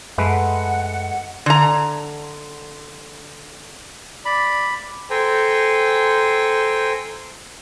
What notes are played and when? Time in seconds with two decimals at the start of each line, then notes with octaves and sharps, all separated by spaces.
0.18 F#2 G#3 A3 B4 F#5
1.46 D3 A#5
4.25 D5 B5
5.10 A4 C5 G5 G#5 A#5